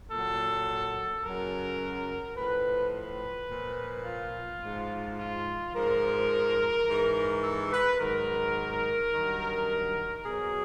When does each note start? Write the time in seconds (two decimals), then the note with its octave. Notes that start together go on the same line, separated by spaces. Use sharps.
0.11 A#2 F#3 A4
1.23 F#2 C#3 F#3 A#4
2.36 A2 F3 B4
2.93 B4
3.49 A#2 F3
4.05 F4
4.61 G#2 F3
5.18 F4
5.74 G#2 F3 A#4
6.86 G#2 E3
7.43 A4
7.71 B4
7.99 G#2 D#3 F#3 A#4
9.11 G2 D#3 F#3
10.23 B2 F#3 G#4